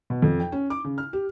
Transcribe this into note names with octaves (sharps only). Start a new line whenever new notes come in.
B2
F2
G5
C#4
D6
C#3
F6
G4